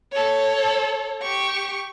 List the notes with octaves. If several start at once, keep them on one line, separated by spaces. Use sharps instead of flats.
A4 C#5
G4 C#6